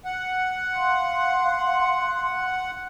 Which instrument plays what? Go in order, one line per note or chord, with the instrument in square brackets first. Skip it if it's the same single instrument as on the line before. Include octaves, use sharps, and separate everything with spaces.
[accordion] F#5
[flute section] F5 C6